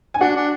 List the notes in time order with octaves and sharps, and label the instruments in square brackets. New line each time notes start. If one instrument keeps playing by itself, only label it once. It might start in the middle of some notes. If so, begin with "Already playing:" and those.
[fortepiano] G#5
[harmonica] D4 [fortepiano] F#4 F#5
[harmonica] D4